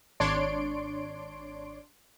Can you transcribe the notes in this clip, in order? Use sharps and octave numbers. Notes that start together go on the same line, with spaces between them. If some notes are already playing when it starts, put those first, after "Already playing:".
G#1 D4 C#5 D5 C6 D7